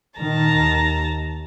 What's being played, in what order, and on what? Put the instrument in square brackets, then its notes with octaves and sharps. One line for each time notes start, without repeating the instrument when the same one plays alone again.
[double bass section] A#2 D#3 [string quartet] A5 A#5
[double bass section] D#2